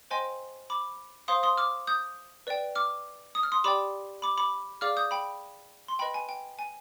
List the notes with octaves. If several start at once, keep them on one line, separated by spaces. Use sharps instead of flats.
C5 D#5 G5 G#5 C6
B5 D6
C5 F5 C6 D#6
C6 D#6
D6 F6
D#6 G6
B4 D5 G5
D6 F6
D#6
F6
C6 D#6
G4 D5 G5 B5 D6
B5 D6
B5 D6
G#4 D5 F5 D6 F6
D#6 G6
G5 B5
C6
B4 D#5 G5 B5
G#5
G5
G#5